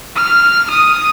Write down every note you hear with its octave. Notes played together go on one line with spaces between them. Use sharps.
F6
D#6